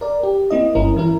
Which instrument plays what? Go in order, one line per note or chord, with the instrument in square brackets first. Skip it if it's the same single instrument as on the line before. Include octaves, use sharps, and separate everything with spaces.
[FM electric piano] A#4 D5
G4
A#3 C4 E4 D#5
G1 G2 C#4 E4 A#4
E3 E4 A#4